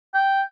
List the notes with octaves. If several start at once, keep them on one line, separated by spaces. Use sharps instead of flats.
G5